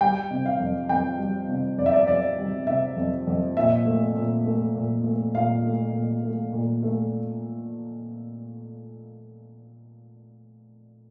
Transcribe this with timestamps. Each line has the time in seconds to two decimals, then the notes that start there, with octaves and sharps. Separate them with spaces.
0.01 G3 G5
0.31 C3
0.46 F5
0.60 F2
0.89 F2 G5
1.19 G3
1.49 C3
1.78 F2 D5
1.86 E5
1.93 D5
2.07 F2 D5
2.38 G3
2.67 C3 E5
2.96 F2
3.27 F2
3.57 A#2 E5
3.85 A3
4.15 A#2
4.45 A3
4.75 A#2
5.04 A3
5.35 A#2 F5
5.64 A3
5.93 A#2
6.23 A3
6.52 A#2
6.83 A3